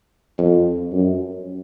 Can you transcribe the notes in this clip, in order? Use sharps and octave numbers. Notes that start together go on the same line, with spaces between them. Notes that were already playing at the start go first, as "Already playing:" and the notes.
F2
F#2